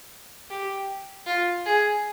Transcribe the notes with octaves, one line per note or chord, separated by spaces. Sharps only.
G4
F4
G#4